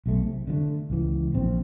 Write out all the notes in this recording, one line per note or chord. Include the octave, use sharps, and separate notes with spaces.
B1 A3
C3
D3 F3 A3
C#2 E3
A#1 C4